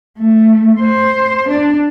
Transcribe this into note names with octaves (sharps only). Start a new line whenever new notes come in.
A3
C5
D4